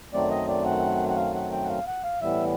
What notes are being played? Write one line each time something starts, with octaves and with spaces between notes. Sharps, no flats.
F#2 D#3 F#3 A3 C4 D5
D#5
D5
F#5
F#5
F5
F#5
G5
F#5
F5
F#5
F5
A2 E3 G3 B3 E5